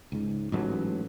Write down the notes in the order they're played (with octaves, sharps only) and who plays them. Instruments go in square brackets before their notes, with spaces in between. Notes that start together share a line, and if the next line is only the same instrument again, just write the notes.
[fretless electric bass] C#2 G#2
A1 G#2 F#3